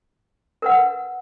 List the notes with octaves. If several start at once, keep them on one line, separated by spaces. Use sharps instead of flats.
A#4 B4 F#5